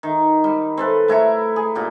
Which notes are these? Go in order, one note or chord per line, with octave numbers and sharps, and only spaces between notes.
D#3
G3
C4 A4 B4
A3 E4 A#5 C#6
G#4
A#2 G4